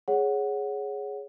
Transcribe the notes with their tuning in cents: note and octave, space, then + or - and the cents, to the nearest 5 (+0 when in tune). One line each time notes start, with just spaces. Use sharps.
G#4 +0 C#5 +0 F#5 +0